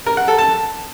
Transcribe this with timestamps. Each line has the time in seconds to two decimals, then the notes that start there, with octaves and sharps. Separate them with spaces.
0.06 A#4
0.17 F#5
0.28 A4
0.39 A5